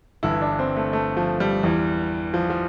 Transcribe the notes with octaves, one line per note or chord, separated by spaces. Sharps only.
G1 G2 E3 E4
D4
C4
A3
A3
F3
G3
E2 E3
F3
F3